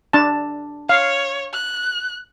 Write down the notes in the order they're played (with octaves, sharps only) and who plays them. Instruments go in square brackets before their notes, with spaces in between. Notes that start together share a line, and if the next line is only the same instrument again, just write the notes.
[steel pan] D4 A5
[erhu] C#5 [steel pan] F5
[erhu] F#6